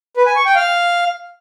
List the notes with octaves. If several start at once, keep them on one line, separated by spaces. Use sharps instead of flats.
B4
G#5
C#6
G5
F5